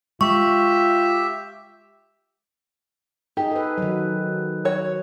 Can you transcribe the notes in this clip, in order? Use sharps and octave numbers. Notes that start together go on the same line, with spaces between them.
G#3 F4 G4 E5 C#6
D#4 G4 G#4
A4 B4
D#3 F#3
F#4 C#5